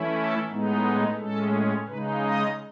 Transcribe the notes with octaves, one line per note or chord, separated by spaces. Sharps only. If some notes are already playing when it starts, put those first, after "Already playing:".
Already playing: E3 A3 C#4 E4
A4
A2 G#3 B3 D#4
G#4
A2 G#3 C#4 A4
C#3 G#3 D#4 B4
D#5